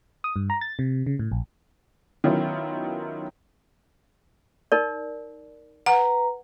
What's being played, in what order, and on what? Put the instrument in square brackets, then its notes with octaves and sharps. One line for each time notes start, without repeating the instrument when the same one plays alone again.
[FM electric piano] D#6
G2
A#5
A6
C3
C#3
A2
A#1
[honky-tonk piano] D#3 F#3 B3 C#4 E4 F4
[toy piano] D#4 A#4 D5
[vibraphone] B4 A#5 [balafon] F#5